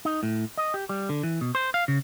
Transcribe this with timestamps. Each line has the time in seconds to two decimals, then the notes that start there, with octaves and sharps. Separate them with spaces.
0.05 D#4
0.23 A2
0.58 D#5
0.74 G4
0.89 G3
1.09 D3
1.23 E3
1.41 B2
1.55 C5
1.74 F5
1.88 C#3